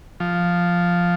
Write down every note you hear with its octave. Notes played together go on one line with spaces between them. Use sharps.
F3